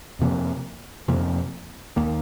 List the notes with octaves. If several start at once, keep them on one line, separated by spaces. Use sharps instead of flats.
F2 C3 F3 A#3
F2 C3 F3 A#3
D#2 D#3 A#3